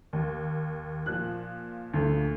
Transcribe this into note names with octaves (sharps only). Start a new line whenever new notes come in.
D#2
A#2 F3 F#6
D2